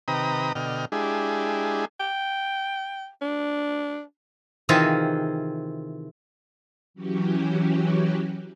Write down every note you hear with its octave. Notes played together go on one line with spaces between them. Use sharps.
C3 D#3 B4 G5 A#5 D#6
B2 D3 D#5 G5 F6
G#3 D4 E4 G4 G#4
G5
D4
C3 D#3 E3 C4 F4 G#4
E3 F#3 C#4 F#4 G4